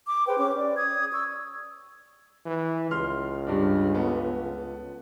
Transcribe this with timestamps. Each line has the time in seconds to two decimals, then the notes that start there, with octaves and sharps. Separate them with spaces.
0.07 D6
0.27 G#4 B4 C5 G5
0.39 C#4 D6
0.57 D5
0.76 D#6 G#6
1.11 C#6 E6
2.46 E3
2.91 C#2 C6 F6
3.47 G2 D4
3.95 B3 A4